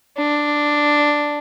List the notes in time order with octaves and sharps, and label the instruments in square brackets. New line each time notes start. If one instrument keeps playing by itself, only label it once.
[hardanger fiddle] D4